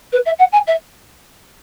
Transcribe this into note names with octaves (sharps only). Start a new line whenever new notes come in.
B4
E5
F#5
G#5
E5